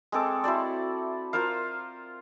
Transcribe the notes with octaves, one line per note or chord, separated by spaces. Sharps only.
G#3 C4 A4 D6
E4 F#4 C5 D5
F4 A#4 C5 F5